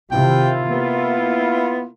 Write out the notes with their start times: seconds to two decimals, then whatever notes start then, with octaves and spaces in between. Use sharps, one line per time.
0.11 C3 D#3 E4 F4 G5
0.69 A#3 B3